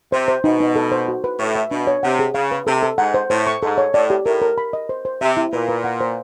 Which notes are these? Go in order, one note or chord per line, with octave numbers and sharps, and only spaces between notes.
C3 C5
C5
B2 D#4
D#4
A4
C5
F#4
B4
A2 C#6
E5
B2 D4
C#5
C3 F#5
G#4
C#3 F5
B4
C3 A4
A4
G#2 F#5
C5
A2 C5
C#6
G#2 A4
C#5
A2 D5
G4
A2 A#4
A#4
B5
D#5
C5
C5
C3 E5
E4
A#2 B4
B4
F#5
C5